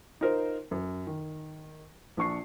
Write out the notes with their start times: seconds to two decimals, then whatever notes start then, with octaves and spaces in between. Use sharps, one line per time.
0.21 D#4 F4 A#4 C5
0.71 F#2
1.07 D#3
2.17 A#1 D4 C#6 C7